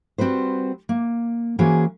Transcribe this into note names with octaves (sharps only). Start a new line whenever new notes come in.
G3 C4 F#4 B4 C5
A#3
E3 A#3 C#4 F#4 G#4 C5